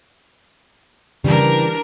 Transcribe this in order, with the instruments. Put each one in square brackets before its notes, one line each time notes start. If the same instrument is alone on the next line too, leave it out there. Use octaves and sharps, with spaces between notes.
[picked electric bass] C#3 [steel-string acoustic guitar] E3 G3 [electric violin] D4 A#4